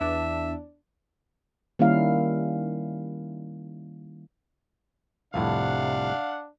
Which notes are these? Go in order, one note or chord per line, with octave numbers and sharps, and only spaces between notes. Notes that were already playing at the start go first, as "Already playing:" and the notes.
E2 D4 E5
D#3 G3 A#3 C#4 E4 F5
C2 F2 A2 C3 D4 F5 F#5